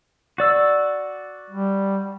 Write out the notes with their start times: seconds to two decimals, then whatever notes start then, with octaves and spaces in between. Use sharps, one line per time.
0.38 F#4 D5 E6
1.50 G3